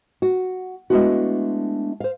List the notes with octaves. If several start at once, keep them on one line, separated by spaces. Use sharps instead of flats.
F#4
G#3 A3 B3 D4 E4 F#4
C5 F5